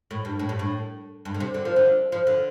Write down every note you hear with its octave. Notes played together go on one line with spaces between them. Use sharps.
A2
G2
A2
G2
A2
G2
D3
C3
D3
F3
D3
F3
D3